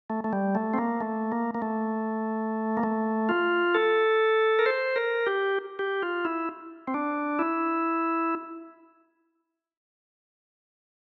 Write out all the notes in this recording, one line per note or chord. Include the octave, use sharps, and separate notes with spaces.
A3
A3
G3
A3
C4
A#3
A3
A#3
A#3
A3
A#3
A3
F4
A4
A#4
C5
A#4
G4
G4
F4
E4
C4
D4
E4